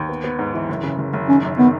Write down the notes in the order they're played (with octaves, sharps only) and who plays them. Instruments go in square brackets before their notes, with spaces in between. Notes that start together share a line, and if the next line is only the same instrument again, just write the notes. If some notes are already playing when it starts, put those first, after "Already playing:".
Already playing: [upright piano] D#2
B3
B3
G#2
E3
F#1
C#3
F#1
F#1
[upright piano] D#3 [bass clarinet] C#4
[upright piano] F#2
[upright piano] D#3 [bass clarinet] B3